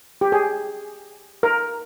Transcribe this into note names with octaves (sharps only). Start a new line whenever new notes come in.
G4
G#4
A#4